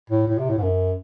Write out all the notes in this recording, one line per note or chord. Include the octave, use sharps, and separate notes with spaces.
A2
A2
C3
A2
G#2
F#2